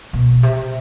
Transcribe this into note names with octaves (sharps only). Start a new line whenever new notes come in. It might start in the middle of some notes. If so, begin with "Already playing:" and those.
B2
C3